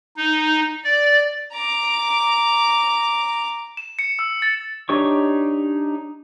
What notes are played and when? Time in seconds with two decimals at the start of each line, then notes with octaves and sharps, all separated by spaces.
0.17 D#4
0.84 D5
1.53 A#5 D6
3.77 E7
3.99 C#7
4.19 E6
4.42 A6
4.89 D4 D#4 G4 C#5 C#6